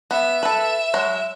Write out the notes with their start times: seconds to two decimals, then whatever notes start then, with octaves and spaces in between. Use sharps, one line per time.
0.11 B3 E5
0.43 A4 B4
0.94 F#3 G#3